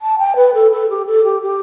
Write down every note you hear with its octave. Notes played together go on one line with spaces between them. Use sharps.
A5
G5
B4
A4
A4
G4
A4
G4
G4